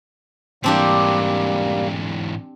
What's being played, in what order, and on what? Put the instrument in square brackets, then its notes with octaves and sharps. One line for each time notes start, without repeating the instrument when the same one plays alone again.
[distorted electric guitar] G#2 E3 [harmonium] G3 A#3 [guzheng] C4 D4 G4